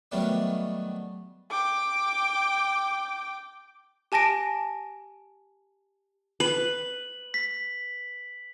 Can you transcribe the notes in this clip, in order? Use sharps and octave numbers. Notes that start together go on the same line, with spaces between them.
D#3 F#3 G3 A3 B3 D4
G5 D6
G4 G#5 A5 A#6 D7
B4 F#7
B6